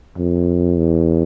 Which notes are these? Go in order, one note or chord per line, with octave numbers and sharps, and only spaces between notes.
F2
E2